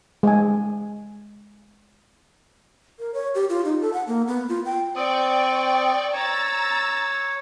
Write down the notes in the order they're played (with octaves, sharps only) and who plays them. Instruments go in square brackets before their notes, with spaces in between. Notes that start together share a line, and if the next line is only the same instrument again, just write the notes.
[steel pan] G#3 G#5
[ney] A#4
C#5
G4
F4
D#4
A4
F#5
A#3
B3
F4
G5
[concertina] C4 D#6 [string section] D5 G5 C#6
[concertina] C#5 [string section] A#5 E6 A6